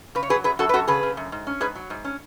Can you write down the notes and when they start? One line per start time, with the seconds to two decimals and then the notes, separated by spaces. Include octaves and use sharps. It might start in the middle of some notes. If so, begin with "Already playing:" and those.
0.15 C#3 B4
0.23 C#5
0.29 F#3 G#4 B4
0.44 F#2 G#4 B4
0.59 F#2 F#4 A4
0.69 B4
0.73 F#2 F#4 A4
0.87 C#3 G#4 B4
1.03 C#3
1.17 F#2
1.32 G#2
1.47 C#4
1.60 G#2 G#4 B4
1.75 F#3
1.90 G#2
2.04 C#4